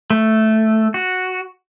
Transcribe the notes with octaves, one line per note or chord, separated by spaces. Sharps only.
A3
F#4